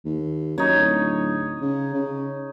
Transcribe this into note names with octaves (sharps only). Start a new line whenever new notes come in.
D#2
F#2 D#4 C#5
D1
C#3
C#3